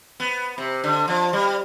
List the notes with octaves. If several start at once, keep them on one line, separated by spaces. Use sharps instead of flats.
B3
C3
D3
F3
G3